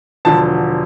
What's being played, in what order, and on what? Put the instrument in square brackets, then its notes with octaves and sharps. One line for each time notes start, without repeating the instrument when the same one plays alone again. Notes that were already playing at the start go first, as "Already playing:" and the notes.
[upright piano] E1 D3 F3 A5